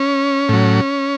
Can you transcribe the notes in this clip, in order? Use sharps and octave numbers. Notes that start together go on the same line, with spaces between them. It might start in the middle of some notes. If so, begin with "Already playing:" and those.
Already playing: C#4
A2 F#3